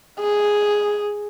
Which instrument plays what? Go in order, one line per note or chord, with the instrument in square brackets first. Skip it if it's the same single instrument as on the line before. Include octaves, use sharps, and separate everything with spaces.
[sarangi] G#4